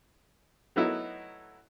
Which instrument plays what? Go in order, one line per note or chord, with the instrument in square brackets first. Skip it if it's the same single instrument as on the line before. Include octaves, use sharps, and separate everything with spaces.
[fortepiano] F#3 A3 B3 D#4 E4